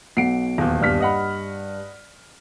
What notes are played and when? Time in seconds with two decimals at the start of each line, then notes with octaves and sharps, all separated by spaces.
0.17 B1 F#5 C7 D7
0.58 D#1 E2
0.81 G2 F6 B6
1.00 D#5 F#5 B5